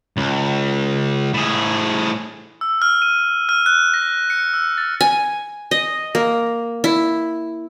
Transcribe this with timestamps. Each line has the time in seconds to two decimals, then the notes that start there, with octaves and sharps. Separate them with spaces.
0.17 C#2
1.34 A2 G#4
2.61 E6
2.82 F6
3.02 D#7
3.49 F6
3.66 F#6
3.94 A#6
4.30 C#7
4.54 E6
4.78 A6
5.01 G#5
5.71 D#5
6.15 A#3
6.84 E4